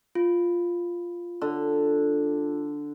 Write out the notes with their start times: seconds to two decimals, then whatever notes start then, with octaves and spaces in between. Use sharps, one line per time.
0.15 F4
1.41 D3